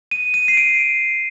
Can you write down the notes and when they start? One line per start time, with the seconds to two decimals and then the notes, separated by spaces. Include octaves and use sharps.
0.11 D#7
0.34 D#7
0.48 C7
0.57 D7